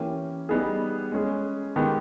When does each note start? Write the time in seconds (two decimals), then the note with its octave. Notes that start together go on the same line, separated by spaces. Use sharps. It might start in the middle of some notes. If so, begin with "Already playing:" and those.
Already playing: E3 A#3 C#4 G4
0.49 G3 B3 D#4 G#4
1.12 G#3 C#4 G#4
1.76 D#3 G#3 B3 G4